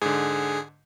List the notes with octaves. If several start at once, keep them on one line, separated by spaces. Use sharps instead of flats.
G#2 D3 G#4